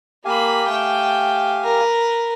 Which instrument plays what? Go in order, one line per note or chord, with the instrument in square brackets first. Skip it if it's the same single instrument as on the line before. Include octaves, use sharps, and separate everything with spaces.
[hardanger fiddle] A#3 B5 [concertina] G4 F5 G#5
[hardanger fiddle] A3 G5
A#4 B4